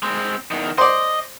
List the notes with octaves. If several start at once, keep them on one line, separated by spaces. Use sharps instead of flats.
G#3 C4
E2 D#3
C5 D5 D#5